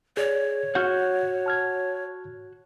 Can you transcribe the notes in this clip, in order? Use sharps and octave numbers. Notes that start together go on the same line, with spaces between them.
G#4 C#5 D5
F#4 F#5 F6 G6
A5 F6 G#6